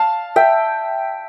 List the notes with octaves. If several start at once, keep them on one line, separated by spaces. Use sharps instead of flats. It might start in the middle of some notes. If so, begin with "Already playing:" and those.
Already playing: F5 A5
E5 G5